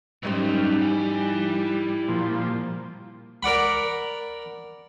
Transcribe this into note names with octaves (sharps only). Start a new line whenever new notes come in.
G#2 F#3 G3 C#4 D#4 C5
E4 G#5
A#2 F3
A#4 D5 F#5 B5